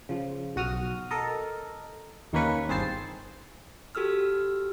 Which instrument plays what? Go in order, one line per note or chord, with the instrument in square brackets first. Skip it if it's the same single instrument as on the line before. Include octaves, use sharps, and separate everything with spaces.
[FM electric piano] C#3 F3
B1 F#4 D#6 F6
A4 A#4 D#5
D#2 D#3 A#3 C#4 B4 C#6
G1 C4 G#4 C5 A5 C7
[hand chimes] F#4 G4 A4 E6 F6